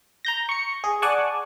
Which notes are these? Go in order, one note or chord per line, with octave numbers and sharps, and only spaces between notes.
A#5 G6 A#6
C#6 C#7
G#4
D5 F#5 G#5 A5 C#6